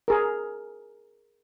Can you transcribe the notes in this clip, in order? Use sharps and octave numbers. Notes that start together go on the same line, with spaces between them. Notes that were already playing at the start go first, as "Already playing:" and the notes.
G#4 A#4